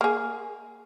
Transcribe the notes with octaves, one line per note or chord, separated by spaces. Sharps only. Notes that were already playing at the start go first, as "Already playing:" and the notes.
A#3 G#4